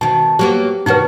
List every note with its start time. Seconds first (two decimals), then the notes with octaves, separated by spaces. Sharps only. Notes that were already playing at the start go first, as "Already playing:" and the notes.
0.01 B2 D#3 A5
0.39 F#3 A#3 B3 G4
0.86 B2 D#3 D#4 F#4 B4